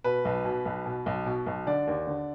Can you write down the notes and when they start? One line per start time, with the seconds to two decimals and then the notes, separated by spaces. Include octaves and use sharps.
0.04 B2 B4
0.25 B1
0.45 B2
0.65 B1
0.86 B2
1.06 B1
1.26 B2
1.46 B1
1.67 D3 D5
1.87 D#2
2.07 D3